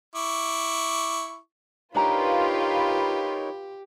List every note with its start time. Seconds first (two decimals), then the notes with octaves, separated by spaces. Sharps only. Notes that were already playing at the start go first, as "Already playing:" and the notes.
0.16 E4 C#6 D6
1.95 D4 D#4 F4 G4 A#4 B4 C#5 A#5